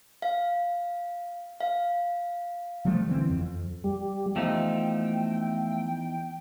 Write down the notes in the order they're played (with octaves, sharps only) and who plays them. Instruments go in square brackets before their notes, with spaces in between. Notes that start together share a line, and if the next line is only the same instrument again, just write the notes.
[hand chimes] F5
F5
[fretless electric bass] F3 G3 A3
D3 E3 C4
F2
[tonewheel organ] G3
[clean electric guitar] E2 D#4 [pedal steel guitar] F3 A3 [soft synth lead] G5